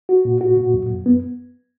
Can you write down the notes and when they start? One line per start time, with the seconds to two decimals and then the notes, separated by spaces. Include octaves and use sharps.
0.09 F#4
0.25 A#2
0.41 F#4
0.57 A#2
0.74 F#2
0.89 F#2
1.06 B3